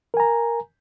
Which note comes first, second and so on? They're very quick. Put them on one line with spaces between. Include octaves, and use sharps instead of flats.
A#4 G#5 A#5